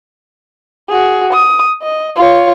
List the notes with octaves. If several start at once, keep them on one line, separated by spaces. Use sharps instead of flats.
F#4 G#4
D#6
D#5
F4 C#5